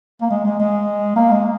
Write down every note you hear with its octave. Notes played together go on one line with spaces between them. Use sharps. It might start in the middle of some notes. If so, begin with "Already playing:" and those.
A#3
G#3
G#3
G#3
A#3
G#3